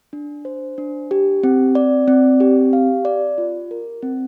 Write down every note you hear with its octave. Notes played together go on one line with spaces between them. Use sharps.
D4
C5
D4
G4
C4
D5
C4
G4
F5
D5
F4
A#4
C4